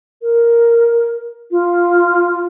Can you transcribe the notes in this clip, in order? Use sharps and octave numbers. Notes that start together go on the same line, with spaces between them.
A#4
F4